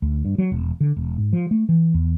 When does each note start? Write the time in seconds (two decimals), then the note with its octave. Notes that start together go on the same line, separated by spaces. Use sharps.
0.02 D2
0.25 G2
0.38 F#3
0.52 E1
0.80 D3
0.96 E1
1.18 G#2
1.33 F3
1.51 A3
1.69 E3
1.94 E2